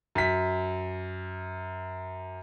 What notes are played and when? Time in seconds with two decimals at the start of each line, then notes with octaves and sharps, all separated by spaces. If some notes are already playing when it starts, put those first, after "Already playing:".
0.15 F#2 B6